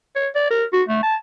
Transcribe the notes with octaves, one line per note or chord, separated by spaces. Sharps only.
C#5
D5
A#4
F#4
A3
A5